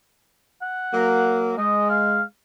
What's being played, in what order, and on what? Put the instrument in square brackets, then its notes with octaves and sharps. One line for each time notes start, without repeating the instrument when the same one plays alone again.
[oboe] F#5
[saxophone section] F#3 A#3
[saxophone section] G#3 [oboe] D#5
[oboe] F5